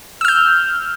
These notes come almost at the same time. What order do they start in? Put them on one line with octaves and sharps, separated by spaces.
E6 F6 G6